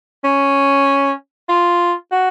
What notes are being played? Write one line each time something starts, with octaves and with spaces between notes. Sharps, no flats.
C#4
F4
F#4